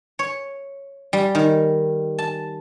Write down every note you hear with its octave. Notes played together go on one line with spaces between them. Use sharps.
C#5
G3
D#3
A5